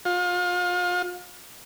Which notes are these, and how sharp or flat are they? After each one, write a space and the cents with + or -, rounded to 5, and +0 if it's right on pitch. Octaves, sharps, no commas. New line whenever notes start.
F4 +35